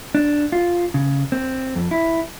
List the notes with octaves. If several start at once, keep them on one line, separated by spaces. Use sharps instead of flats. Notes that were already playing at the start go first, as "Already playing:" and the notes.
D4
F4
C#3
C4
F2
E4